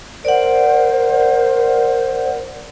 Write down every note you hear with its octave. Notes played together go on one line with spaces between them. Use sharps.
A#4 C5 D5 F#5